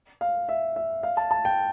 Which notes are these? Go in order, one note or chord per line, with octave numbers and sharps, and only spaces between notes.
F5
E5
E5
F5
A5
A5
G5